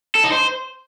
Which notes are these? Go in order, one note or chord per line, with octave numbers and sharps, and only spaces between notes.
A4
D#4
C5